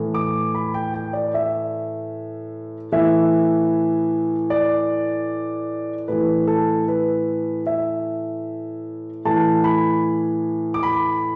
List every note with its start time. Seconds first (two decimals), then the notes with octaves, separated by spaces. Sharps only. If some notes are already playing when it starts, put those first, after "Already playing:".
Already playing: A2 E3
0.14 D6
0.55 B5
0.74 G5
0.94 G5
1.13 D5
1.34 E5
2.92 A2 E3 E5
4.50 D5
6.08 A2 E3 B4
6.47 A4
6.88 B4
7.67 E5
9.25 A2 E3 A5
9.64 B5
10.74 D6
10.83 B5